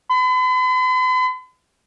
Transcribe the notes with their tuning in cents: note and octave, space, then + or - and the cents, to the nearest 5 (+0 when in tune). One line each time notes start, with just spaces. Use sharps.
B5 +45